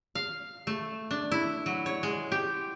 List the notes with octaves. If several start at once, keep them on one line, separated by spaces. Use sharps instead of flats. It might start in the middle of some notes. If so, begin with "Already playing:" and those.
F5
A3
D4
E4
F#3
C#5
G#3
G4